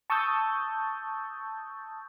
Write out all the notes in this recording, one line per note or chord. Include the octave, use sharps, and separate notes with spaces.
A5 C#6 D#6 E6 G6 A6